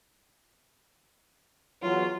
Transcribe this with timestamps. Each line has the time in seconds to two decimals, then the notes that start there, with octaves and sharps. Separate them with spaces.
1.82 E2 F#3 F4